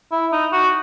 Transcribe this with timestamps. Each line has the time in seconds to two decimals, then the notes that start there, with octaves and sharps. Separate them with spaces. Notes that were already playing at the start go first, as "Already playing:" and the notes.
0.12 E4
0.32 D#4
0.52 F#4